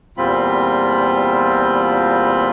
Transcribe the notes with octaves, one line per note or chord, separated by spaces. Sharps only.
E2 A#2 G3 C4 F4 B5